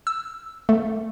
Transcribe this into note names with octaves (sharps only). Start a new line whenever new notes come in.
E6
A3